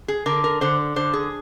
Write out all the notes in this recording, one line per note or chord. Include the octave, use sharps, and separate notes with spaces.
G#4
D3 A#4
A#4
D3 C5
D3 C5
G#4